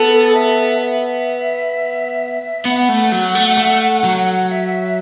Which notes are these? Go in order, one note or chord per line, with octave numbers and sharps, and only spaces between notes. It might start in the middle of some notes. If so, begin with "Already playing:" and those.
Already playing: B3 A4
E5
E5
B3 F#5
A3
F#3
A3
A3
F#3
E5